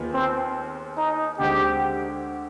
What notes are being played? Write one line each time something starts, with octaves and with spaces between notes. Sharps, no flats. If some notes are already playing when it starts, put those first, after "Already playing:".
Already playing: D#2 D#3 B3 F4 G#4
C4
D#4
D2 D3 G#3 C4 G4